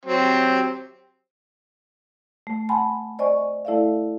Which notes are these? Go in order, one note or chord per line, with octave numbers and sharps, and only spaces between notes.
F#3 C4 G4
A3
F#5 G#5 A5 B5 C6
C5 D5 D#5 G#5 C#6
A3 E4 A4 D5 E5 F5